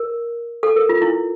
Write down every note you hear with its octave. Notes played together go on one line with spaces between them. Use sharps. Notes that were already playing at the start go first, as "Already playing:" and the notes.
Already playing: A#4
A4
A#4
F4
E4